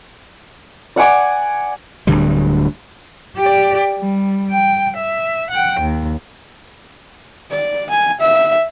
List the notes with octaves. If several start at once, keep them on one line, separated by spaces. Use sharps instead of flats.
D5 F#5 G#5 D6
D1 D2 D3 G3
G4 D5
G3
G5
E5
F#5 G5
D#2
D5
G#5
E5